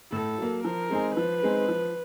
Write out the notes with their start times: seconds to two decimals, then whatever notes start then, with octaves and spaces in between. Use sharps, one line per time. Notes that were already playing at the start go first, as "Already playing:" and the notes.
0.12 A2 A4
0.38 F#3 A#3
0.64 F3 A#4
0.90 G#3 C4 D#4 G#4
1.16 F3 B4
1.43 G#3 C4 D#4 G#4
1.68 F3